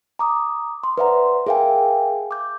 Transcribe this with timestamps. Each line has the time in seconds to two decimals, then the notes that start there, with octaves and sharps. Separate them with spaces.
0.19 A#5 D6 D#6
0.84 C6
0.98 B4 C5 D5 E5 F#5 A#5
1.47 G#4 A#4 E5 F5 G5 G#5
2.31 D6 G6